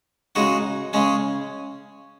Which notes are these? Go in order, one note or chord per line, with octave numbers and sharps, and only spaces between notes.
C#3 G#3 D#4 F#4
C#3 G#3 C#4